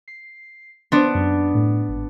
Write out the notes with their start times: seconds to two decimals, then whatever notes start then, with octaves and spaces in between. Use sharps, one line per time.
0.08 C7
0.92 B3 D4 C5 C6
1.15 F#2
1.55 A2
1.89 G#1